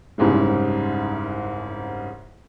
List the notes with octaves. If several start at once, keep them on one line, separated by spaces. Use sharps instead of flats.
F#1 C2 G#2 C#3 G3